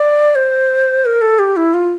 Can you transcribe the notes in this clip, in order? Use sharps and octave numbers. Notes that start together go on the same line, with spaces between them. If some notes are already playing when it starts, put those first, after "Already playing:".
Already playing: D5
C5
A#4
A4
G4
E4
F4